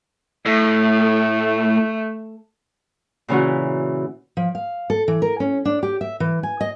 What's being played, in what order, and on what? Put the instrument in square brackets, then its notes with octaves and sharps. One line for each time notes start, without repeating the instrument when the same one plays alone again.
[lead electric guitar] A2 [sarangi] A3
[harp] A#2 C#3 E3 C#4 E4 F#4
[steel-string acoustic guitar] F3
F5
A4
E3
A#4
C#4
D4
G4
E5
E3
G#5
D#5